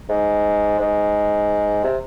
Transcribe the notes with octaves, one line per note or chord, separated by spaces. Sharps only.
G#2
G#2
C3